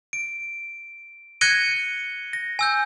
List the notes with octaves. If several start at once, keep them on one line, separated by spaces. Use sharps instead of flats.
D7
F#6 G#6 A#6 C#7 D#7 G7
A#6
G#5 E6 G6